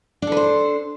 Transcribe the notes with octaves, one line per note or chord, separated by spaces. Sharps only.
D4 A4 B4 C5